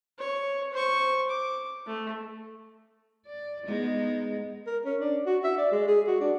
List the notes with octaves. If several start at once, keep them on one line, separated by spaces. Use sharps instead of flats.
C#5
C5 C#6
D6
A3
D5
G#3 B3 D#4
A#4
C#4
D4
F#4
E5
D5
G#3
G#4
F#4
D4